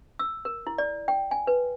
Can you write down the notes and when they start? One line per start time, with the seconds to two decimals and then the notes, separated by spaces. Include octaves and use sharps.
0.19 E6
0.45 A#4
0.67 E4
0.78 D5
1.08 G5
1.31 G#5
1.47 B4